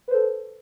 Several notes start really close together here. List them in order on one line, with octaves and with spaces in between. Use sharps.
B4 C5 A4